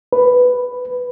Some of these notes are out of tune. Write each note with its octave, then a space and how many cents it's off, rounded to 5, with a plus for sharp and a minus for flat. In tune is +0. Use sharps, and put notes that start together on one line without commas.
B4 +5